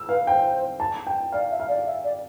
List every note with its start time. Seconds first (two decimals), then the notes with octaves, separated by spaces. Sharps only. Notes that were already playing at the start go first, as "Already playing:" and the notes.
Already playing: E6
0.09 B4 F5
0.27 C5 G5
0.80 A5
1.07 G5
1.32 D5 F5
1.51 E5
1.60 F5
1.68 D5
1.86 E5
2.04 D5